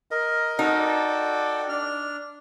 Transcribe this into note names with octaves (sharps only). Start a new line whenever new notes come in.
A#4 D#5
D#4 F#4 A4 G5
D5
D4 F6